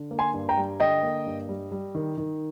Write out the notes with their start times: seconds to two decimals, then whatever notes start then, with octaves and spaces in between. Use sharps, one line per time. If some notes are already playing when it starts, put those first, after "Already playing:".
Already playing: D3
0.11 A#3
0.19 G#5 C6
0.34 G2
0.49 G5 A#5
0.57 G3
0.80 D3 D#5 G5
1.03 A#3
1.26 G2
1.49 G3
1.72 G3
1.95 D#3
2.18 D#3